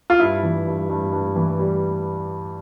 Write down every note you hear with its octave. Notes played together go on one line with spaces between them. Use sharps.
F4
G2 E4
E3
G2
G2
G2
E3
G3